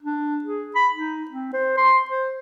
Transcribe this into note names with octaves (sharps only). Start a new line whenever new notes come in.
D4
G#4
B5
D#4
C4
C5
C6
C5